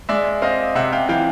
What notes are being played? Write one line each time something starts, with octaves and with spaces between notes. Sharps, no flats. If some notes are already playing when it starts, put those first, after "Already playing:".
G#3 D5 E5
C4 D#5 F5
C3 E5 F#5
F5 G5
E3 F5 G5